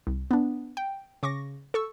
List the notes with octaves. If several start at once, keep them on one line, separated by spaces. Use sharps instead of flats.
C2
B3 D4
G5
C#3 C#6 D6 A#6
A4 C#6 E6